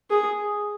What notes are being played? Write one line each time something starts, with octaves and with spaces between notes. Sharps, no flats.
G#4